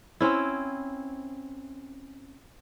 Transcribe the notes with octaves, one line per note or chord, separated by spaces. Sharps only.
C4 C#4 E4